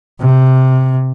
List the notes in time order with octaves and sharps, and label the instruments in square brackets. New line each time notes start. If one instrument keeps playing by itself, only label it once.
[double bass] C3